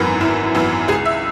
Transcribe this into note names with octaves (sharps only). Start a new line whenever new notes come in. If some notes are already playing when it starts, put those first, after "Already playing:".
Already playing: G#1 F#2 E3 B3 A#4 B4
G#1 E4
F#2 E3 B3 E4
C#2 G#4
E5